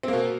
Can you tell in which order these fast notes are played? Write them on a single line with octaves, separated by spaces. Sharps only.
C4 A#3 B2